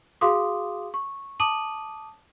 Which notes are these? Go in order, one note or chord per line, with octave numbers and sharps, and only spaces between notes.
F#4 G#4 F5 C6 D6 D#6
C#6
A5 D6 D#6 D#7 F#7